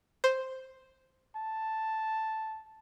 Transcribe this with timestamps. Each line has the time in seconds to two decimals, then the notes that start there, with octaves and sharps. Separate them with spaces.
0.24 C5
1.36 A5